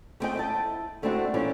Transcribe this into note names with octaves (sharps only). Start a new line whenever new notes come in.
A3 B3 C4 G#4 D#5 G5
E4 D#5 A5
G#3 A3 C4 D4 E4 F#4
E3 G3 A#3 C4 C#4